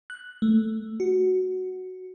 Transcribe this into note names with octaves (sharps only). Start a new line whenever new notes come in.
F#6
A3
F#4